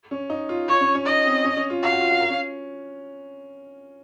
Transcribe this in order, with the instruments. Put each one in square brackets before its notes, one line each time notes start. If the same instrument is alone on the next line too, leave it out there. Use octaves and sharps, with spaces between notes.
[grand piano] C#4
D#4
F4
[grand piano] F4 [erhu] C#5
[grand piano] C#4
C#4
[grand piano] D#4 [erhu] D#5
[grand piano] C4
C#4
C#4
F4
[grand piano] F#4 [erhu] F5
[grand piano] F#4
F4
F#4
A#4
C#4